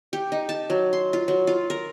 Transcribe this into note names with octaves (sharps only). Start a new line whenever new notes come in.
G4
D#4
A5
F#3
C6
F4
F#3
F4
A#4